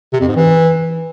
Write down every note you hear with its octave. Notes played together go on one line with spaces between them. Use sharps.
C3
F2
G#2
E3